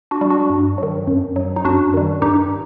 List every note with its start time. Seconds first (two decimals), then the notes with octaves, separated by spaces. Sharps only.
0.11 D4 F#4
0.21 G3
0.30 D4 F#4
0.50 G2
0.78 D#3 F#3
1.07 F#2
1.36 F#3
1.56 D#4
1.65 F#2 D4 F#4
1.94 D#3 G3
2.22 G2 D#4 G4